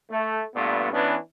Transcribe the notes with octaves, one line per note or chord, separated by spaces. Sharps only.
A3
G2 A#2 A3 B3
E3 B3 C#4 D4